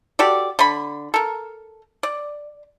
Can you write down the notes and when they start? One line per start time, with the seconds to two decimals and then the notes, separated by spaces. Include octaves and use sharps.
0.19 F#4 G4 A4 D5
0.59 D3 B5
1.14 A4 A#4
2.03 D5